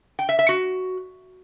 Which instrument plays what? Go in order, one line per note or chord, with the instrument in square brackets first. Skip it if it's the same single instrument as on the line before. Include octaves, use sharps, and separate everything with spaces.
[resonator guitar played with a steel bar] G5
E5
E5
F#4